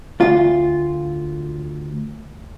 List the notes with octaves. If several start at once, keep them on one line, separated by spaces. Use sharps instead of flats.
D2 F4